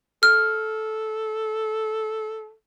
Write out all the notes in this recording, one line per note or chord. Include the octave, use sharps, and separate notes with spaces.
A4 F6